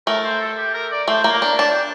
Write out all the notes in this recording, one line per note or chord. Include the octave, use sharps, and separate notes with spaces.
A3 A#4
C5
A4
G4
A#4
D5
A3 C5
A#3
A#4
D4
D4 A5
G5